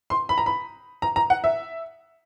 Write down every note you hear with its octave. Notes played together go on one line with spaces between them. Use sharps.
C6
B5
A#5
B5
A#5
A#5
F#5
E5